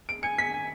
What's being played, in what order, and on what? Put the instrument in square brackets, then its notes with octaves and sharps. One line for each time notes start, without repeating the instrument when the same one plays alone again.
[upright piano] D7
[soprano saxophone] G#5 [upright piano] C#7
[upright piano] B6
[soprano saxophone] G#5